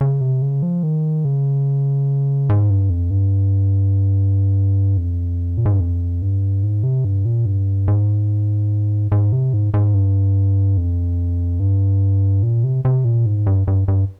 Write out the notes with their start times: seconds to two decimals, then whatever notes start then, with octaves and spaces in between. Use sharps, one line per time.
0.01 C#3
0.21 C3
0.42 C#3
0.63 F3
0.83 D#3
1.25 C#3
2.49 G#2
2.70 G2
2.90 F2
3.10 G2
4.97 F2
5.58 A#2
5.66 G#2
5.72 G2
5.80 F2
6.22 G2
6.63 G#2
6.83 C3
7.05 G2
7.25 A#2
7.46 G2
7.88 G#2
9.12 G#2
9.32 C3
9.53 G#2
9.74 G#2
9.94 G2
10.77 F2
11.60 G2
12.43 A#2
12.64 C3
12.85 C3
13.05 A#2
13.26 G#2
13.47 G2
13.67 G2
13.88 G2